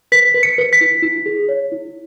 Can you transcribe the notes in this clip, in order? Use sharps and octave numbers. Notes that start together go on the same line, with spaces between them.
B4 B6
B4
C#7
B4
B6
E4
E4
G#4
C#5
E4